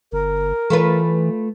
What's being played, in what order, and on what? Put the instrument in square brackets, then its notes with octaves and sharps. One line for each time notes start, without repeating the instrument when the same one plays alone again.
[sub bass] G1 [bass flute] A#4
[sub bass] E3 [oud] A3 F4 B4